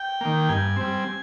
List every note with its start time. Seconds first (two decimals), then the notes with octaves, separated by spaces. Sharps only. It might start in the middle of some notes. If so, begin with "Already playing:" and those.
Already playing: G5
0.21 D#3 A#3
0.49 G2 G#5
0.76 G3 C4